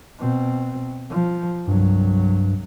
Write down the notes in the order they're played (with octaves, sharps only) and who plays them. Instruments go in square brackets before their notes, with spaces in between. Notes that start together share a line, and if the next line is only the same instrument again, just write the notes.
[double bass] B2 C4
F3
[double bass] C2 F#3 [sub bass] G2